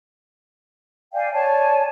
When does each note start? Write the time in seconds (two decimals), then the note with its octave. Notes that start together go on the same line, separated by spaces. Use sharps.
1.13 D5 F5 G5 G#5
1.33 C#5 D5 G#5 A5